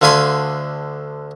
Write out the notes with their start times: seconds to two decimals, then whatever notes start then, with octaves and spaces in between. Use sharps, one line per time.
0.01 D2 D3 F5 G#5 B5 C6